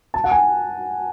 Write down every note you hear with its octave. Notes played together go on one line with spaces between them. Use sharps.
A5
F#5
G#5